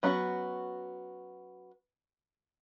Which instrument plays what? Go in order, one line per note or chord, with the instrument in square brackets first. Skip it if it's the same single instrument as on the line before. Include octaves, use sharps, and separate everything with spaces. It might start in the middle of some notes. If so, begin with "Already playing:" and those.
[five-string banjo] F#3 B3 C#4 F4 F#4